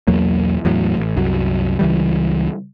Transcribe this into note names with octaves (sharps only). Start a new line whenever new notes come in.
B1 E2 F#3 A#3
E2 A2 F#3
A1
C2 F#2 F#3
C#2 E3 G3